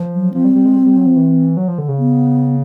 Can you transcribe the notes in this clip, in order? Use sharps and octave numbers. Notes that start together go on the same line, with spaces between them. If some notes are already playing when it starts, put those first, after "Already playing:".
Already playing: F3
F#3
F3 C4
G3
G3
G#3
G3
G3
F#3
F3
E3
F#3
F3
D3
C#3
B3